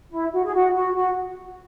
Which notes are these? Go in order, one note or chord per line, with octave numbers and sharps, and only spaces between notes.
E4
F#4
G#4
F#4
F#4
F#4